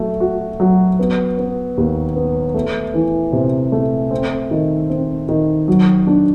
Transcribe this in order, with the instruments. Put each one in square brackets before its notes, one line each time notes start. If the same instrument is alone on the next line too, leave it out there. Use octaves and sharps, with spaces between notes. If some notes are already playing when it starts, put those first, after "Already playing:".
Already playing: [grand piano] F#3 A3
F#4
F#3
B3
B3
D#2
B3
A3
E3
C3
A3
C4
D#3
C4
D#3
F#3
D4